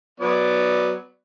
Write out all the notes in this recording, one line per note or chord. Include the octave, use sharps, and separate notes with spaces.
F#3 B3 D5